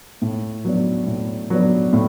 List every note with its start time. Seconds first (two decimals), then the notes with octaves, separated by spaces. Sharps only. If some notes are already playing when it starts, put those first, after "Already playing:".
0.22 A2
0.65 F#3 B3 D4
1.07 A2
1.50 F#3 B3 D4
1.93 A2